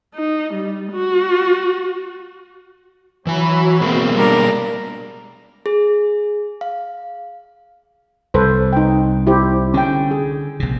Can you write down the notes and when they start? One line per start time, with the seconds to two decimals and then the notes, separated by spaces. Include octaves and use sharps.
0.14 D#4
0.54 G3
0.92 F#4
3.27 E3 F#3 F#4 G#5 B5
3.80 B2 G#3 A#3 C4
4.15 G3 D4 A#4 D5
5.66 G#4
6.61 F5
8.34 C2 A4 B4 C5
8.73 D#4 G5
9.27 E4 G4 C5
9.74 D3 C#4 G5
10.11 G#4
10.60 A#1 C3